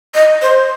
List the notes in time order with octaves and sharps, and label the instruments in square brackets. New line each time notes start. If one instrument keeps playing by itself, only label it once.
[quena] D#5
C5